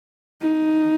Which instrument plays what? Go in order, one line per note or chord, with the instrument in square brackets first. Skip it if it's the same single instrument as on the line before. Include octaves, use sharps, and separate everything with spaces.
[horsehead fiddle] D#4